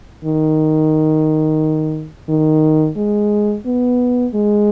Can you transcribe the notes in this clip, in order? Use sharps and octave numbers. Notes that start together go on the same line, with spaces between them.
D#3
D#3
G#3
B3
G#3